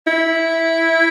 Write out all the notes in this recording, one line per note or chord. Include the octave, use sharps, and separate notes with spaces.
E4